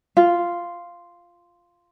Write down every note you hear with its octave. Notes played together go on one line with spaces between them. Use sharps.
F4